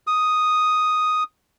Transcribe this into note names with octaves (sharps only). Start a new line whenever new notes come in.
D#6